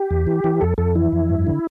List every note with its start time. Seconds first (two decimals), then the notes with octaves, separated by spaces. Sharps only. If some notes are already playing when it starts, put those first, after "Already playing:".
Already playing: G4
0.11 E2
0.27 E3
0.44 E3
0.61 F2 A4
0.78 F2 A4
0.95 E3 E4
1.12 F2
1.29 G2
1.47 D3